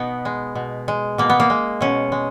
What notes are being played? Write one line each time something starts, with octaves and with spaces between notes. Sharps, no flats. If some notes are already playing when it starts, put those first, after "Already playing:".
Already playing: B2 B3 D#4
G#3
B2
G#3
B2 A#3
B3
A#3
G#3
B2 C#4
G#3